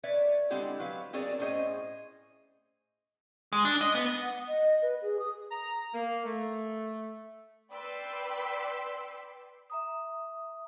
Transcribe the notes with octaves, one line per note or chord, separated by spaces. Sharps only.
B4 C#5 D5 E5
C#5
D3 G#3 C4 E4 G4 F#5
F#3 B4 F5
C4 F#4 G#4 A#4 C#5 D5
A2 C#4 G#4 C5 D#5
G#3
D4
D#5
B3
F#5
D#5
B4
G#4
D#6
A#5
A#3
A3
B4 D5 G5 C6 E6 B6
E5 A#5 D#6